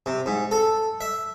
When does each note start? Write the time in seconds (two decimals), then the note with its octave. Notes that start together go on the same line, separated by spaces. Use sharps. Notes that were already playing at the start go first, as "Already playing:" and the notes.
0.06 C3
0.26 G#2
0.51 A4
1.01 E5